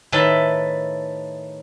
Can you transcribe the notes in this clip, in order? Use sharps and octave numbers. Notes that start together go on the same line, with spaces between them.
A2 D#3 B4 E5 A5